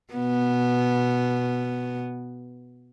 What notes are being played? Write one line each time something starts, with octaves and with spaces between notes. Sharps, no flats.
B2 B3